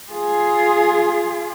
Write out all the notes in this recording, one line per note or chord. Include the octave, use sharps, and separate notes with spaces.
F4 G#4